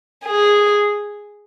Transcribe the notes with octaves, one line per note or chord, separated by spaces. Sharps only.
G#4